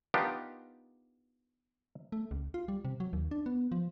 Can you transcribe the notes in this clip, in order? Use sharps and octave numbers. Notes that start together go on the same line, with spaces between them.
B3 D4 D#4 F4 G4 A#4
A3
C#2
F4
G3
C3
F#3
D#2
D4
B3
F3